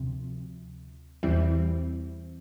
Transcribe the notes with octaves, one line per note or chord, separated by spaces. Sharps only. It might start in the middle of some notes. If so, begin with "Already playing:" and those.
Already playing: D2 C3 F3
E2 E3 G3 C4 E4